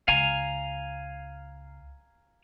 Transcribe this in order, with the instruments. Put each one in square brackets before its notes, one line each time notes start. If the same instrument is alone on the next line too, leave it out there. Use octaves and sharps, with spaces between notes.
[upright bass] C#2 [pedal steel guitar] F5 G#5 A#5